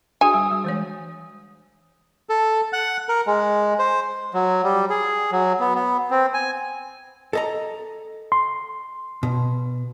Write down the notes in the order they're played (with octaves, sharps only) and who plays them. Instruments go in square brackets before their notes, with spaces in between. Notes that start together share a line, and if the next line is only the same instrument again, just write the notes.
[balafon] D4 F#4 G#4 [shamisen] G#5 [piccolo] D#6
[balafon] G3
G3
E3 G#3 C#5
[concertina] A4
F#5
A#4
G#3
C5
[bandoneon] F#3
G3
G#4
F#3
B3
B3
C4
G#5
[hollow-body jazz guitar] A4 D#5 A#5
[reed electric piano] C6
[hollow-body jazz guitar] B2